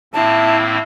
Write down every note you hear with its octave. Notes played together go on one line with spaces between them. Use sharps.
A2 A#3 C4 E4 A5